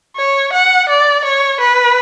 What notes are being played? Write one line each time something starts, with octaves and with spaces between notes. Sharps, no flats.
C#5
F#5
D5
C#5
B4